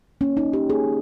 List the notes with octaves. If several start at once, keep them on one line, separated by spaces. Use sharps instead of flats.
A#3 C#4
D#4
D#3
G4
A#3 G#4